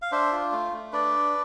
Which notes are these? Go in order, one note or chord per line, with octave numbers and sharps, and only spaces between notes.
F5
D4 C5 E5
F4
A3
A3
D4 B4 D5